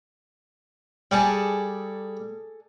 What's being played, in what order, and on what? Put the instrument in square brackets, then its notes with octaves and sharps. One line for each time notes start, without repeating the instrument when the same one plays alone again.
[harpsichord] G3 A5 [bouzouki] G#4 A4 D5